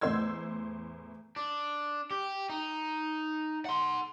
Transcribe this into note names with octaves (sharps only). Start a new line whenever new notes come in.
E2 A2 C5 C6 E6 G#6
D4
G4
D#4
F#5 C6